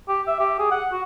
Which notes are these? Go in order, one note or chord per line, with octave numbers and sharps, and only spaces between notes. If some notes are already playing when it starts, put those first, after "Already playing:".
G4
E5
G4
G#4
F#5
F#4